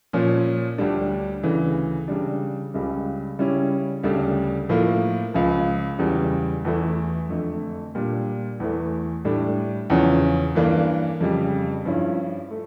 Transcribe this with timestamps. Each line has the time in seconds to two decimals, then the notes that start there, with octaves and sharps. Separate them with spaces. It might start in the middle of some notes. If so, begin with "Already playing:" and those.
0.13 A#2 F3 C#4
0.78 D2 D3 G3 D4
1.43 D2 C#3 E3
2.08 C#3 G3 D4
2.74 C#2 C#3 G3
3.39 C#3 G3 C#4 E4
4.04 D2 C#3 G3 D4
4.69 A2 F3 A#3
5.34 C#2 C#3 F3
5.99 E2 C#3 G3
6.65 E2 E3 A3 E4
7.29 F2 D3 A3
7.95 A#2 G3 D4
8.60 E2 E3 A3
9.25 A2 G3 D4
9.90 E2 C#3 F3 C#4
10.55 G2 E3 A#3 D4
11.20 F2 C#3 G3
11.85 G2 F3 C#4 E4
12.51 A3